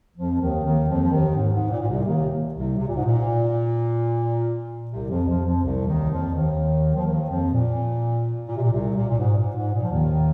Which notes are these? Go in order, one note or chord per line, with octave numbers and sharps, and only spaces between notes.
F2 F3
D#2 D#3
D#2 D#3
F2 F3
F3
D#2 D#3
G#2
G#2
A#2
A#2
C2 C3
D#2 D#3
C2 C3
C3
A#2
G#2
A#2
C2 C3
F2 F3
F2 F3
F2 F3
C2 C3
D#2 D#3
F2 F3
D#2 D#3
F3
D#2 D#3
F2 F3
A#2
A#2
C3
A#2
C2 C3
A#2
A#2
G#2
A#2
G#2
A#2
F3
D#2 D#3